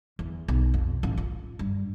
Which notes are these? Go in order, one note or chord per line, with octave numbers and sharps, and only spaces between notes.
E2
B1
F2
A1
F4
G2